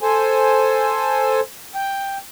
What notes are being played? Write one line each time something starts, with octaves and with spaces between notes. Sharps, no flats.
A4 C5 G#5
G5